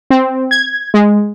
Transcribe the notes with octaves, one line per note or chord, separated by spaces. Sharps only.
C4
G#6
G#3